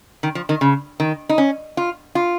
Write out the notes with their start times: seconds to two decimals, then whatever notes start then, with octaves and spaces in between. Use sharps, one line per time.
0.23 D#3
0.35 F3
0.49 D#3
0.61 C#3
1.00 D#3
1.29 D#4
1.38 C#4
1.77 F4
2.15 F4